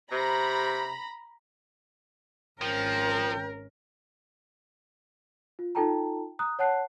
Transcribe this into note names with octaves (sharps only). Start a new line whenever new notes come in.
C3 A#5 B5
G#1 F3 C#4 A#4 G5
F4
D#4 F4 A4 G5 A5 A#5
A#5 D#6 F#6
C#5 F#5 A5 F#6 C7